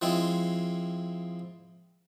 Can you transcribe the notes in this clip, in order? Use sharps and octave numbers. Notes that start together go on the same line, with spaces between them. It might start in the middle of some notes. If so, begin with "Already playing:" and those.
F3 G#3 C4 E4